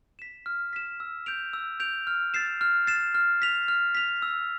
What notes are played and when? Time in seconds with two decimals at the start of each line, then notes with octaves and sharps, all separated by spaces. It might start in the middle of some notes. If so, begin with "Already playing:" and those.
0.19 B6 E7
0.46 F6
0.73 B6 E7
1.00 E6
1.26 G6 D7 F7
1.53 E6
1.80 G6 D7 F7
2.07 F6
2.34 A6 C7 E7
2.61 F6
2.87 A6 C7 E7
3.15 F6
3.42 B6 F7
3.68 F6
3.95 B6 F7
4.22 E6